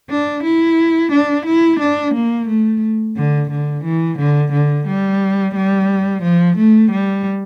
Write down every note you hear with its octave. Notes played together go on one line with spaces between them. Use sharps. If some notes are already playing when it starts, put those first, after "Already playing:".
D4
E4
D4
E4
D4
A#3
A3
D3
D3
E3
D3
D3
G3
G3
F3
A3
G3